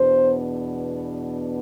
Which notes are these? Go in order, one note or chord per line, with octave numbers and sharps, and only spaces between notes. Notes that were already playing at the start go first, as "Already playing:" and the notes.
Already playing: E2 B2 B3 D4 C5